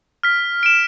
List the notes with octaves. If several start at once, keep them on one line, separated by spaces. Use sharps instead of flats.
F6 B6
D7 E7